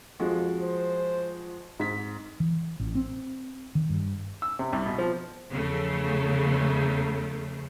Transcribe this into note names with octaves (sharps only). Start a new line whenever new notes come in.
F2 F3 G#3 F#4
C5
G#2 C4 B6
E3
A1
C4
D#3
G2
E6
C3
C2
B2
F3
E2 C#3 F3 A3